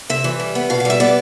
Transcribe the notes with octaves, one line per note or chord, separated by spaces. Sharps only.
C3 E5
E3
G3
B3
B2 F5
F5
G3 E5
B3 D5